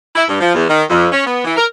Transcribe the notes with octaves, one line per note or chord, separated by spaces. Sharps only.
E4
G2
F3
E2
D#3
F2
C#4
B3
E3
A#4